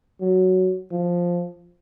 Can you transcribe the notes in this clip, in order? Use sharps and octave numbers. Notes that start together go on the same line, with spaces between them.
F#3
F3